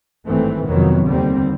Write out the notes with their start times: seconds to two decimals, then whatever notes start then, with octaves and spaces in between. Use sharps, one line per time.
0.27 G#1 G2 E3 A3 C4
0.67 F2 C3 D#3 F#3 B3
1.07 D#2 D3 G3 C4